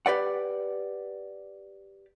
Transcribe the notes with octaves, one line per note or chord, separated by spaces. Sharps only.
G4 B4 D5 F#5